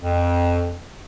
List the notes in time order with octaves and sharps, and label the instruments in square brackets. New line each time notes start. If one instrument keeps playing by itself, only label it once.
[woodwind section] F2